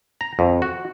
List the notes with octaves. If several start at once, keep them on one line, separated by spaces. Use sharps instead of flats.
A#5
F2
F#4